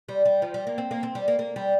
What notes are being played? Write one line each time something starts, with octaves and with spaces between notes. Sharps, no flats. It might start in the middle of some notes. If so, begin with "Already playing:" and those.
G3
G3
F3
G3
A#3
C4
A#3
C4
G3
A#3
A#3
G3